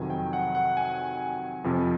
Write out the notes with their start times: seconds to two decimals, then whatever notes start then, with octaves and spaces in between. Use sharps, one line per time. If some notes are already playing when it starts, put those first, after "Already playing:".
Already playing: F2 C3 D#3 F#3 G#5
0.10 G5
0.33 F#5
0.55 F#5
0.77 G#5
1.64 F2 C3 F3